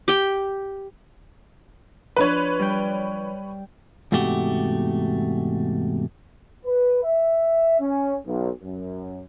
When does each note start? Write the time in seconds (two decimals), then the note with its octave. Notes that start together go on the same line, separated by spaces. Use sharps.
0.08 G4 G5
2.17 F3 D4 B4 C#5
2.59 G3 G5
4.12 E2 G#2 C3 A3 F#4 G4
6.65 B4
7.03 E5
7.80 C#4
8.26 B1
8.62 F#2